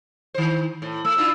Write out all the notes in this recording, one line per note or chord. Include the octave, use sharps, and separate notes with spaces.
D#3 C5
A2
A3 E6
D4 E4 F4